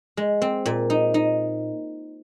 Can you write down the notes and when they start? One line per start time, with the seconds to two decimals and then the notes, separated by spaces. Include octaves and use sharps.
0.17 G#3
0.42 C4
0.66 A#2
0.90 D#4
1.14 D#4